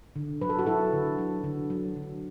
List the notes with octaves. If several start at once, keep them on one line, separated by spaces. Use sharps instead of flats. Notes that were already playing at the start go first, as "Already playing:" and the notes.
D3
F#3 B4
A4
F#4
F#3 E4 A4
D3
F#3
D3
F#3
D3